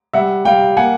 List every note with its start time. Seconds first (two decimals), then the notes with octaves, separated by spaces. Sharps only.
0.13 G3 E5 F#5
0.45 G3 F5 G5
0.77 A#3 F#5 G#5